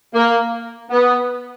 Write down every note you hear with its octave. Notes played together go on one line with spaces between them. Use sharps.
A#3
B3